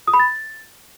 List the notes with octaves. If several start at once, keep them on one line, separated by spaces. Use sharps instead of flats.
D#6
B5
A6